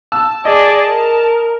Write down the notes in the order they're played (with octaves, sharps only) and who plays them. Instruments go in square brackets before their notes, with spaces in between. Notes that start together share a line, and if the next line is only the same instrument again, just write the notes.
[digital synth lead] A5 [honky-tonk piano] E6
[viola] G#4 D5 [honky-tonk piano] D#5
[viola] A#4